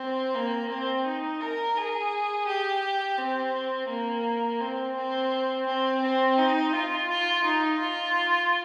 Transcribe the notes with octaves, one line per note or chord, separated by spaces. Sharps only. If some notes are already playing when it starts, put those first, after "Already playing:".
Already playing: C4
A#3
C4
D#4
A#4
G#4
G4
C4
A#3
C4
C4
C4
C4
D#4
F4
F4
D#4
F4